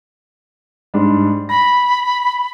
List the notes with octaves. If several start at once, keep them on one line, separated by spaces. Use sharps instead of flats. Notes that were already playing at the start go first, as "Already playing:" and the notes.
G#2 G3 D4
B5 A#6